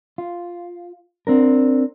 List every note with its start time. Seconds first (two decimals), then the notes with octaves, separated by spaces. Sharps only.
0.18 F4
1.27 C4 D4 A#4